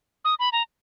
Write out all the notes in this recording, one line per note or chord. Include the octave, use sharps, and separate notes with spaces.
D#6
B5
A#5